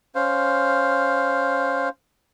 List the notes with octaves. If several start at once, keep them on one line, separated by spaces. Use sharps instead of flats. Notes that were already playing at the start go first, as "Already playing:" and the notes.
C#4 C5 F5